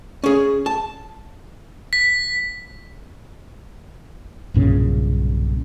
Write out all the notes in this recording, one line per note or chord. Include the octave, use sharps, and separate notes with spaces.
C#4 G#4
A5
B6
B1 G2 A#2 C#3